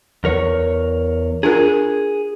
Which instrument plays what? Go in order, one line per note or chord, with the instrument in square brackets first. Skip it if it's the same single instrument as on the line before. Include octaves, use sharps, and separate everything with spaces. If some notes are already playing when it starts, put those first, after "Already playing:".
[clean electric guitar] E2 A#4 C#5
[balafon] D4 F4 A#4 [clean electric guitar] G#4